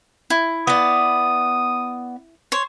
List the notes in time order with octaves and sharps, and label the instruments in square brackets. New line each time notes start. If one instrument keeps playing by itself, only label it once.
[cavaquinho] E4
[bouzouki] B3 D5 [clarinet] D#6
[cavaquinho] C5 C#5